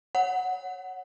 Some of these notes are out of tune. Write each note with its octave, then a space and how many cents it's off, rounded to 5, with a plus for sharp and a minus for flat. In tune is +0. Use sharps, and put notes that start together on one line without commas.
C#5 +0 F#5 +0